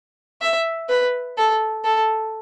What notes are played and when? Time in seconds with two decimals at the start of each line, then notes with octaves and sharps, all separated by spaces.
0.41 E5
0.89 B4
1.38 A4
1.84 A4